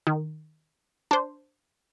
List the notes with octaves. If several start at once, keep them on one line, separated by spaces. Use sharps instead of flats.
D#3
D4 C5